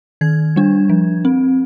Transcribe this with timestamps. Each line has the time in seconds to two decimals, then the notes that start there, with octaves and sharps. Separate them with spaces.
0.21 D#3 G#6
0.56 G3 D4
0.89 F3
1.25 C4